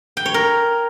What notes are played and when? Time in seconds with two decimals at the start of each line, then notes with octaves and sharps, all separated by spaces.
0.17 G5
0.26 C#5
0.34 A#4